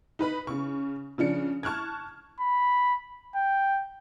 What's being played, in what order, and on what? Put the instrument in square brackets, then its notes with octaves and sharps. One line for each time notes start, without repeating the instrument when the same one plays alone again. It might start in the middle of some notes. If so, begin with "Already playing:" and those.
[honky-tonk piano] D#4 B4 B5
C#3 C#6
C#3 F3 D4 C#7
A5 C#6 F6 F#6 G#6
[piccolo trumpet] B5
G5